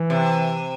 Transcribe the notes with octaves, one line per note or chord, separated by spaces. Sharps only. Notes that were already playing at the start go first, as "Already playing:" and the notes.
Already playing: E3
C3